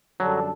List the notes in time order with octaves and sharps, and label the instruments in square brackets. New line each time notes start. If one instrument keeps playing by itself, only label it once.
[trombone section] F#2 D3 G3 D4 A4 [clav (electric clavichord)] F#3